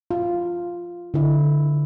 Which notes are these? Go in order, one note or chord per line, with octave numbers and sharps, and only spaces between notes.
F4
D3 E4